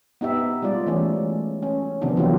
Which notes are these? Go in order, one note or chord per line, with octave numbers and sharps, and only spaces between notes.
B3 D#4 G4 E5
G3 G#3 F4 D5
E3 G#3 A3 C#4
C#4
C3 D#3 F3 B3 D4
E3 F#3 A#3 B3 F4 G4